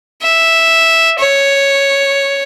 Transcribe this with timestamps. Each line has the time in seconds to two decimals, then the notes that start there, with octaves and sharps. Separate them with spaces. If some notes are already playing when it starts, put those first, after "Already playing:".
0.22 E5
1.19 C#5